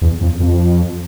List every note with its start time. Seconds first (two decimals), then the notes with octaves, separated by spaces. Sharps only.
0.02 E2
0.21 F2
0.40 F2